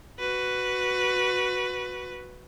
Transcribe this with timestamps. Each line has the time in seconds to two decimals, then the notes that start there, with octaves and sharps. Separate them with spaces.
0.19 F#4 B4